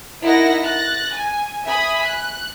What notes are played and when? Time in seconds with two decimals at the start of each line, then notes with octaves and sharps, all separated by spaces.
0.22 D#4 E4 A#4 D#5 F#5 A#6
0.63 F#6 A6 A#6
1.13 G#5
1.65 E5 G#5 B5 D#6
2.04 F#6